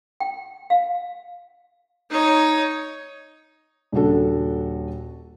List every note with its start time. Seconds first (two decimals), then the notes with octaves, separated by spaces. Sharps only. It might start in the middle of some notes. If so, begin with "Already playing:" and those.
0.20 G5
0.70 F5
2.10 D#4 C#5
3.92 D#1 C#3 D4 F#4 A4